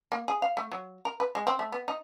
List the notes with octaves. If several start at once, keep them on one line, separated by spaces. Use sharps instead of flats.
A#3
G#4
F5
A3
F#3
A#4
B4
G#3
C4
A3
B3
D#4